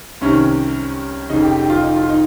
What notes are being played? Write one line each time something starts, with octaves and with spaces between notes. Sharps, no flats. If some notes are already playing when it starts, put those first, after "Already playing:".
C2 C3 D#3 C#4
F1 F2 C#3 D#4
G4
G4
D#4
F4
D#4
F4
D#4